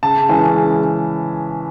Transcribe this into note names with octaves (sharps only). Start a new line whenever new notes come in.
C#3 A5
E3 G#3 C#4 E4
C#3